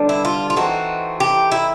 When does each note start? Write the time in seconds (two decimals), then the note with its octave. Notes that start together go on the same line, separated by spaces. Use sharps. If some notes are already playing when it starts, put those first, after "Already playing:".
Already playing: D3 G3 B3 D4
0.09 E4
0.25 F4
0.50 F4
0.56 E3 A3 C4 D#4 F#4
1.20 G4
1.52 E4